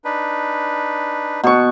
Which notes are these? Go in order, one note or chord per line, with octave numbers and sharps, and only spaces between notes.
D4 D#4 B4
B2 C#6